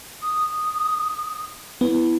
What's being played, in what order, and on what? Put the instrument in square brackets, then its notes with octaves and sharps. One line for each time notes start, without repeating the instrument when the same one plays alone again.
[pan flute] D#6
[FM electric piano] B3 [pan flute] E4